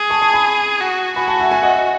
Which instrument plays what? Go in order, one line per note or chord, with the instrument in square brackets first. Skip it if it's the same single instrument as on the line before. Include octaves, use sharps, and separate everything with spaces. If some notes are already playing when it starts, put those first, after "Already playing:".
Already playing: [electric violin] G#4
[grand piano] A5 C#6
A5 C#6
G#5 B5
[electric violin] F#4
[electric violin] F#4 [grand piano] G#5 B5
[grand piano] F#5 A5
E5 G#5
E5 G#5
D#5 F#5
D#5